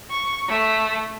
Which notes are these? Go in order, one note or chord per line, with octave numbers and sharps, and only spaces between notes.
C#6
A3